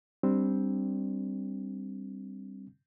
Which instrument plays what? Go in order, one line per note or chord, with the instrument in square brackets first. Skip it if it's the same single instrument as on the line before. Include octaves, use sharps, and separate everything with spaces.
[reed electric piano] G3 C4 D4